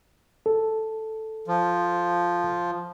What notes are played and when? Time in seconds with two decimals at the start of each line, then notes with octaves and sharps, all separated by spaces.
0.46 A4
1.48 F3